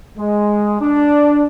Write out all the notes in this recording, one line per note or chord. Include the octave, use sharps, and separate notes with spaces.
G#3
D4